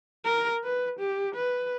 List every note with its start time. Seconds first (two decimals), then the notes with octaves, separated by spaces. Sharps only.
0.25 A#4
0.64 B4
0.99 G4
1.35 B4